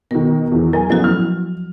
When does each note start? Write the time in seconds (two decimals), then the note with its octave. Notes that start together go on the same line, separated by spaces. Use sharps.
0.11 B2 D#3 A#4
0.52 E2 E3
0.73 F#3 A#4 G#5
0.90 A1 A2 F3 F#3 B3 F#4
1.04 F6